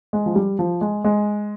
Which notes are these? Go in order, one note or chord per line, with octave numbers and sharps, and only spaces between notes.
G#3
F3
G3
F3
G#3
G#3